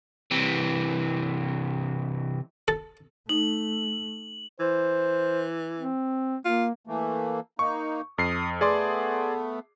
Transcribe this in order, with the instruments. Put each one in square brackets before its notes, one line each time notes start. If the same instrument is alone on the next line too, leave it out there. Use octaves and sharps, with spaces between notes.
[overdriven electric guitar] C3 E3
[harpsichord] A4
[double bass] A3 [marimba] D#4 [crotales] F#7
[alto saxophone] E3 [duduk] C5
[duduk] C4
[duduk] A#3 [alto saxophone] F4
[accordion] E3 A3 A#3
[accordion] A#3 D#4 [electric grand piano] C#6
[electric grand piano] F2 C7 [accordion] D#6
[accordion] A3 B3 [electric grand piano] G#4 D5 C6